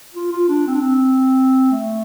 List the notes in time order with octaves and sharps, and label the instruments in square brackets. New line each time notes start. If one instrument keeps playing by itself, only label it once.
[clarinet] F4
F4
D4
C4
D4
C4
A3